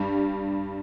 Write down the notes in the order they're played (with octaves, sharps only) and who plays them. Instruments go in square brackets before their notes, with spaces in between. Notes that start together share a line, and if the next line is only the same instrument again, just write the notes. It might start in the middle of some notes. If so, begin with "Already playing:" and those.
Already playing: [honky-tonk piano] G2 G3